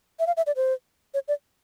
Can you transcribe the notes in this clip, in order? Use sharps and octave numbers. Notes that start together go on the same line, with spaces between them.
E5
F5
E5
D5
C5
C#5
D5